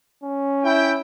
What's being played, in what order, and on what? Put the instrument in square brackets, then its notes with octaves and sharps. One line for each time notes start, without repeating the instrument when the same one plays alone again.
[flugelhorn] C#4
[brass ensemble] E4 G5